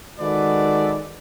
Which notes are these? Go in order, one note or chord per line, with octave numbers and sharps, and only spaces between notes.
D#3 G#3 F#4 A4 B4 D5